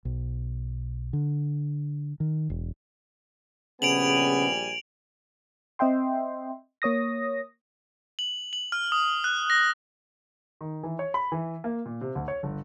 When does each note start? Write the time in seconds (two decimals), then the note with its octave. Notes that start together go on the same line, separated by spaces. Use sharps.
0.05 B1
1.13 D3
2.20 D#3
2.50 E1
3.82 A#1 C#3 G3 B3 G#5 D7 F7 F#7
5.79 C4 D#5 E5 G5 C6
6.82 A#3 C#5 D#6 A#6
8.19 F#7
8.53 F#7
8.72 F6
8.92 D#6
9.24 F#6
9.50 A#6
10.61 D#3
10.83 E3
10.99 C#5
11.14 B5
11.32 E3
11.64 A#3
11.86 A#2
12.01 C3
12.15 D2
12.28 C#5
12.43 G1